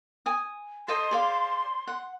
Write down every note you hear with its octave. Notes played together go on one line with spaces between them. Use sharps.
G#5 D#6
A4 D#5 C6 D#6
G#4 D5 F5
F#5